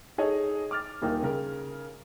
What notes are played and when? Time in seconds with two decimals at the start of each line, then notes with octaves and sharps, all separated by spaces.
0.18 D#4 G#4 A4 C#5 D#5
0.71 D6 F6 A6
1.02 D#1 A#3 D#4 G5
1.23 C#3 A#4